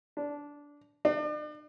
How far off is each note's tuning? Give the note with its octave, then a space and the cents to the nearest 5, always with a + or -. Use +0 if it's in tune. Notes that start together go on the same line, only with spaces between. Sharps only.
D4 -15
D4 +40